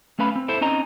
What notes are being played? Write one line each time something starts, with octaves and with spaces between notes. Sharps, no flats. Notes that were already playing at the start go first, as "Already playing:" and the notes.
A3 C#4 B4 F5 B5
C4
E4 A4 C5 E5
C4 C#4 D#4 D#5 A#5